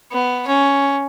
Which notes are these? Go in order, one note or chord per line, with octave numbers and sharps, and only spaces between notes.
B3
C#4